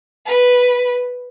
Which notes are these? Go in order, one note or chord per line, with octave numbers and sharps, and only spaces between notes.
B4